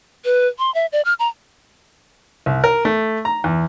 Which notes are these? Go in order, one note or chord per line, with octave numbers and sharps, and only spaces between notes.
B4
C6
E5
D5
F6
A#5
C2
A#4
A3
A#5
E2